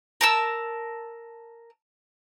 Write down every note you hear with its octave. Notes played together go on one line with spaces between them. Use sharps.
A#4 A5 E6